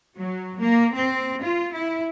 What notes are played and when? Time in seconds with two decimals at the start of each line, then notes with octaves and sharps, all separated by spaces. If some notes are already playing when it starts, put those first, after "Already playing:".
0.17 F#3
0.60 A#3
0.94 C4
1.42 F4
1.74 E4